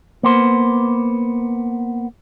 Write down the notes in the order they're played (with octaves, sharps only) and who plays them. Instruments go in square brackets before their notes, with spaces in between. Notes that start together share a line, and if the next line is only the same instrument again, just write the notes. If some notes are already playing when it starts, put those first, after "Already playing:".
[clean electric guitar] A#3 B3 C5